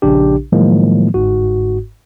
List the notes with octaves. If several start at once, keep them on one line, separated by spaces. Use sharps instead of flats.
A#1 C#3 D4 G4
A2 D#3 F3 F#3 G#3 A#3
G1 G#2 F#4